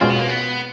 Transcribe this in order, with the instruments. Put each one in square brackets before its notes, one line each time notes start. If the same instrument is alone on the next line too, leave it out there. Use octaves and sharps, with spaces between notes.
[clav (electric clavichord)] B2 G#3 C#4 F4 [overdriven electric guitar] C4
[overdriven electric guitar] B3
A#3
B3